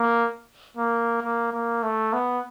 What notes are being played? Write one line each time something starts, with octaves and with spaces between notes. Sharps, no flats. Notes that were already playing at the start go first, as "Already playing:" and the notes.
Already playing: A#3
A#3
A#3
A#3
A3
B3